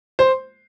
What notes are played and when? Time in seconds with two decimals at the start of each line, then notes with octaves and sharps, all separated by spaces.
0.19 C5